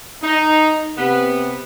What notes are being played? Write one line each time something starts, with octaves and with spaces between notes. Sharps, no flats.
D#4
C3 B3 B4